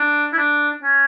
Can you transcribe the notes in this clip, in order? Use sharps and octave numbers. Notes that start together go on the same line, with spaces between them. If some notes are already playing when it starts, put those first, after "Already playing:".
Already playing: D4
E4
D4
C#4